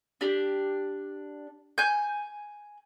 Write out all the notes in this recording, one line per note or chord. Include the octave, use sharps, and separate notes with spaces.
D4 G4
G#5 G6